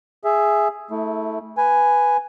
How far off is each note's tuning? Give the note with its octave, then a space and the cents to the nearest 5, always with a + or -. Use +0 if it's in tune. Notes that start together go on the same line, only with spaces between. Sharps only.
G#4 +0 E5 +5
A3 +0 E4 -25
B4 +0 G#5 +0